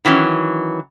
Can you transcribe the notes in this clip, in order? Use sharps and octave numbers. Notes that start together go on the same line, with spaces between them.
D#3 E3 F#3 C#4